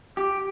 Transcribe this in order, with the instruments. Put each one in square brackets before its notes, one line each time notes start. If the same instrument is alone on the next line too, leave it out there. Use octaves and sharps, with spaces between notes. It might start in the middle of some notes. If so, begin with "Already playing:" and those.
[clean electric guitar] G4